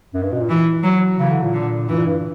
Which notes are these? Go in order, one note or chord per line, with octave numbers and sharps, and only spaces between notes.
F#2
G2
B2
A#2
E3
F#3
C#3 E3
D3
A#2
D3
G2 E3
A#2
G2